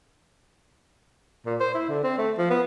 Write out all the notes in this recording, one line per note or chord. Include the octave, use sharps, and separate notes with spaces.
A#2
C5
E4
D3
C4
A3
F3
B3